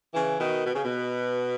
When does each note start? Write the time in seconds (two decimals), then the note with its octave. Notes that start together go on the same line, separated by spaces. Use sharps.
0.14 C#3 E3
0.39 B2 D#3
0.66 B2
0.75 C#3
0.85 B2